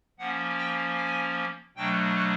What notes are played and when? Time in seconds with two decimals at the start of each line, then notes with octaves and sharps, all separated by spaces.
0.18 F3 A#3 C#4 F#5
0.58 G5
0.97 G#5
1.76 B2 F#3 A3 D4 G5